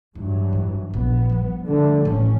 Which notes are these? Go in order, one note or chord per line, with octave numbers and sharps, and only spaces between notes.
E2 G2 E3 F#3
G#2
A#1 B3
F3 G3
D3 A3
D1 A1 A3 C#4